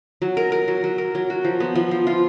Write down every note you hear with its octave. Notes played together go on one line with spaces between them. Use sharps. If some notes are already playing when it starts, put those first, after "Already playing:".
F#3
A#4
A#4
F#3
F#3
A#4
F#3
F#4
F3
B3
F3
F3
F4